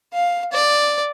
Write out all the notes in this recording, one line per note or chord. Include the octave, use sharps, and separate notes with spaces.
F5
D5